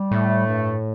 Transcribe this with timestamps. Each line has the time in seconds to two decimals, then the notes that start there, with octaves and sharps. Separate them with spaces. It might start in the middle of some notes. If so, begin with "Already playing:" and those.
Already playing: G3
0.11 A2 A3
0.46 G2